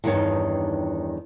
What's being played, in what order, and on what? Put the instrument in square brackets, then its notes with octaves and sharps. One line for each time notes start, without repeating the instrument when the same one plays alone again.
[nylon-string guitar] E2 G2 D#3 D#4 C#5 A5